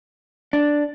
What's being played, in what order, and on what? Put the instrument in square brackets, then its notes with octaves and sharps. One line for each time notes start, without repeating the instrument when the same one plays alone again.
[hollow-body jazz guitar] D4